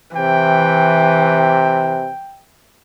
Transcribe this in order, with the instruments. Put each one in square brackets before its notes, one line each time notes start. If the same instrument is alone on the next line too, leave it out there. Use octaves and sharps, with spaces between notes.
[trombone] C3 [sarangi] E3 [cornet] G5